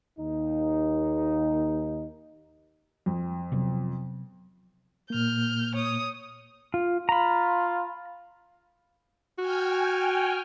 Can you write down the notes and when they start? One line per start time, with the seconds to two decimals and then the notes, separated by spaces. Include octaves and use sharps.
0.18 D#2 D#4
3.06 F2
3.52 C3 F#3 B3
5.10 A#2 A#3 F6 G6
5.75 C#5 D#6
6.74 F4
7.09 F4 A#5 B5
9.39 F#4 G5 G#5 F6